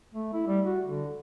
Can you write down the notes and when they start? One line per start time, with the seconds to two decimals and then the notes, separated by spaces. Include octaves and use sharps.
0.14 A3
0.33 E4
0.47 G3
0.66 F#4
0.86 D3